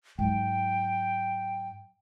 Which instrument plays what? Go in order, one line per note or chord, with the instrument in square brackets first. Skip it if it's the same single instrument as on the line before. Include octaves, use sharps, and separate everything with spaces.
[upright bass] G#2 F#3 [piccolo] G5